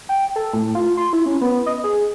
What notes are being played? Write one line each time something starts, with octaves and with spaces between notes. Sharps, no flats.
G5
A4
A2
F4
C6
E4
C#4
B3
D#5
G#4